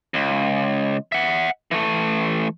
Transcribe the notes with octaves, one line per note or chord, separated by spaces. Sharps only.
C#2
E5 F#5
E3 A3